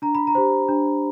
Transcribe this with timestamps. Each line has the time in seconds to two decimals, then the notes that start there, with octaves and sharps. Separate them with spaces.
0.02 D4 A#5
0.15 B5
0.27 A#5
0.35 G4 C5
0.69 D4